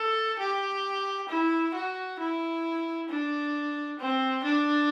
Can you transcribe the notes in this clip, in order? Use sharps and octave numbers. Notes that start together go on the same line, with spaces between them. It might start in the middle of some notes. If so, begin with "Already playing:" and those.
Already playing: A4
G4
E4
F#4
E4
D4
C4
D4